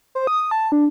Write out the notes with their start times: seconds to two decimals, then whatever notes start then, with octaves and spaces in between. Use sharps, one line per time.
0.15 C5
0.27 D#6
0.51 A5
0.72 D4